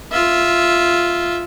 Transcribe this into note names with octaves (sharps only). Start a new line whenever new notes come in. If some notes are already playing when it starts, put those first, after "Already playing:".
F4 E5